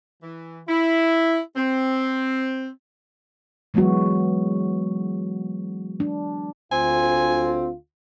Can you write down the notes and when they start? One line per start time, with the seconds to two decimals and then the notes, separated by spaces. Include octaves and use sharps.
0.22 E3
0.68 E4
1.56 C4
3.74 E3 F#3 G#3 B3 F#4
6.00 D4
6.72 D2 C4 F4 G#5